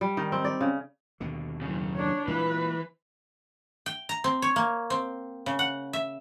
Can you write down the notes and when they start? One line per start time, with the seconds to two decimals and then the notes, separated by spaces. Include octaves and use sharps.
0.01 G3
0.17 D#3
0.32 C4
0.44 D5
0.61 C#3
1.20 D#2 B2 D3
1.62 F#2 C#3
1.95 D4 C#5
2.28 A#2 E3 G#3 A#3 B4
3.86 G5
4.09 A#5
4.24 C4
4.42 C#5
4.56 A#3
4.90 C4
5.46 C#3
5.59 F#5
5.93 E5